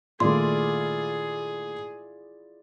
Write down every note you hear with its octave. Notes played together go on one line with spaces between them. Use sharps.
A#2 D#3 A3 E4 F4 G#4 D5 C6